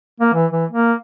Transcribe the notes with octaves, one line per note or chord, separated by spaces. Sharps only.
A#3
E3
E3
A#3